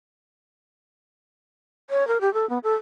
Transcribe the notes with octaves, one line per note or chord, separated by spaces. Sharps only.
C#5
A#4
G4
A4
B3
A4